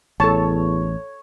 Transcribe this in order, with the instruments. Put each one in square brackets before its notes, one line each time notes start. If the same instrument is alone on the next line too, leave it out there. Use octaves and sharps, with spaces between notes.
[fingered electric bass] A1 [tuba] E2 [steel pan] A4 A5 [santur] C#5